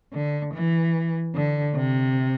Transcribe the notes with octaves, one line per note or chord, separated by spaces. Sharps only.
D3
E3
D3
C3